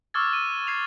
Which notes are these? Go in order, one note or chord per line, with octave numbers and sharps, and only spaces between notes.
C#6 D6 E6 F6 G#6 A6
D#7
G#6 C7 F7